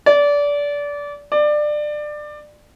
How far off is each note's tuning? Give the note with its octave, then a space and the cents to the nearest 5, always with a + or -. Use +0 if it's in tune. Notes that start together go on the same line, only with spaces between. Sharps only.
D5 -25
D5 +20